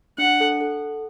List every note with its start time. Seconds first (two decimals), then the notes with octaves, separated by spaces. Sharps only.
0.18 D4 F#5
0.40 A4
0.61 A4